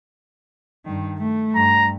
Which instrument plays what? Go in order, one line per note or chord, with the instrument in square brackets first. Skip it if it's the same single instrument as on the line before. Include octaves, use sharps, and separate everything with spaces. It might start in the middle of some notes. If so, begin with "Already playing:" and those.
[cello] G2 D#3
A3
[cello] G2 [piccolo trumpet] A#5